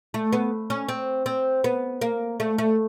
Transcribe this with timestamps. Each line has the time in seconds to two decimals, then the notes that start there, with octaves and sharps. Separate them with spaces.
0.14 A3
0.33 B3
0.70 C#4
0.89 C4
1.26 C4
1.64 B3
2.01 A#3
2.40 A3
2.58 A3